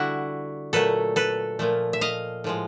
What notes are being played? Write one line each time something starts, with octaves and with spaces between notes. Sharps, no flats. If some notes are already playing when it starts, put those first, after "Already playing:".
Already playing: D3 G3 E4 F#4
A#2 F#3 A3 A4 B4
A4 B4
A#2 F3 A3
E5
D#5 F5
A2 F3 G#3